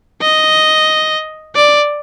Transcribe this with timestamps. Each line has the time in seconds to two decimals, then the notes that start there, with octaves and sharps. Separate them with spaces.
0.22 D#5
1.55 D5